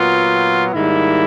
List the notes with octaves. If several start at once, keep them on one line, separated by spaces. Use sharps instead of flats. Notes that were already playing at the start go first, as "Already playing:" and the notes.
Already playing: A#2 F#3 B3 F4
G#2 D#3 G3 A#3 E4